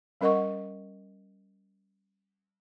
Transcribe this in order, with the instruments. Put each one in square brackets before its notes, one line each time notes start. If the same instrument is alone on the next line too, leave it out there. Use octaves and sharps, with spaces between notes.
[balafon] G3 C#4 A#4 D#5 F#5 C#6